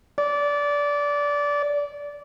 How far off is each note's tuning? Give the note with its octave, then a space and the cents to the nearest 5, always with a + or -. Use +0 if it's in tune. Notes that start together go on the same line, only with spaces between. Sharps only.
D5 -20